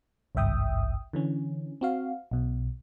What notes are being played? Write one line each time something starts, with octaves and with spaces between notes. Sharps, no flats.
G#1 C#2 G2 E5 G5 D#6
D3 E3 C#4
C4 F#4 F5
B1 B2